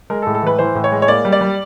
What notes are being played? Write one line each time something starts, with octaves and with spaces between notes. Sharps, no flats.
G#3 A#4
A4
A2
A4
E3 B4
E3 C5
A2
C#5
G#3
C#5
A#3 D5
G3
D5
G3